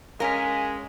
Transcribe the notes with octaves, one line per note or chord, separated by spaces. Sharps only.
G#3 C#4 A#4 F5 G#5 B6